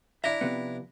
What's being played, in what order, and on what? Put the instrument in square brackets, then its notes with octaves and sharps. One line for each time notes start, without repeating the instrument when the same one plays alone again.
[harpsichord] D4 E4 A#5 [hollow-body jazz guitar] E5
[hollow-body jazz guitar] C3 F3 B3